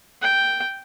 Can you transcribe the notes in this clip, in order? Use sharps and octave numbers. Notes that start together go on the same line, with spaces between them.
G5